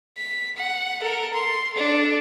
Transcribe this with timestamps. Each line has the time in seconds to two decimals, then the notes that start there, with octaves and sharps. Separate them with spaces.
0.17 B6
0.57 F#5
1.01 A4 A#4
1.33 C6
1.73 D4 A4